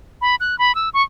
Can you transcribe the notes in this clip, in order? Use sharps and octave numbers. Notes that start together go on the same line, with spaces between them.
B5
F#6
B5
E6
C#6